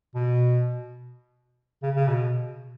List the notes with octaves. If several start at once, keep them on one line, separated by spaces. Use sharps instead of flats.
B2
C#3
C#3
B2